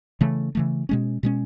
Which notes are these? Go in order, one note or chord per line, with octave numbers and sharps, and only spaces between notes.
C#3 E3 A3
C#3 E3 A3
B2 G#3 C#4
B2 G#3 C#4